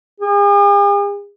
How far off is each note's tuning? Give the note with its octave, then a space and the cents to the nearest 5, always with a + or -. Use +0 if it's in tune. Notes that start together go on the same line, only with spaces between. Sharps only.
G#4 -45